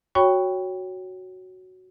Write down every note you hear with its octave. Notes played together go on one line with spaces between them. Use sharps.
F#4 C#5 G5 B5 C#6